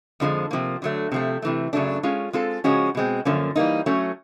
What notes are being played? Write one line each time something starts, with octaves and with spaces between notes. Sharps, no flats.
F2 D3 F3 G#3
C3 F3 A#3
D3 F#3 A3
C3 F3 A3
C3 E3 A3
F#2 C#3 F#3 A3 D4
G#3 C#4 F4
G#3 C4 F4 A4
C#3 F3 G#3 C#4 F#4
B2 G#3 C4
F#2 D3 F3 A#3 C#4
E3 G3 A#3 D#4
F#3 A3 C#4